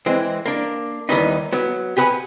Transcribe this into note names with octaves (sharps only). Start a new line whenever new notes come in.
E3 G#3 C4
A#3 D4
D#2 D#3 E3 G3 B3 D#4
F#3 B3
G4 G#4 B4 D5 F#5 G#5